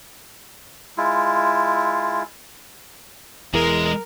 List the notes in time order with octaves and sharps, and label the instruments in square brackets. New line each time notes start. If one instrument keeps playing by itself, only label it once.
[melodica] G#3 E4 F4
[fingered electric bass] E1 E2 E3 [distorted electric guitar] G#3 [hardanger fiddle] A#4